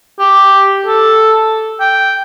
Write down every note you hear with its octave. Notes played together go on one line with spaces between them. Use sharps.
G4
A4
G5